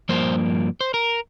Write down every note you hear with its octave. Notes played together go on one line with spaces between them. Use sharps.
G2 F3 A#3 C5
C5
A#4